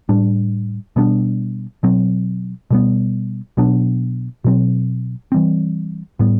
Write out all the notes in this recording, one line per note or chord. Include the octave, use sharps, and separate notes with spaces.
A2 G3 D4
B2 G3 B3 D4
B2 F#3 C4
B2 G3 B3
B2 F#3 B3 D4
B2 F#3 C4
E3 G3 C4
A2 G3 B3